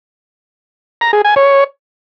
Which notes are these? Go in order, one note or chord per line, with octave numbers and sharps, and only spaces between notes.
A#5
G#4
G#5
C#5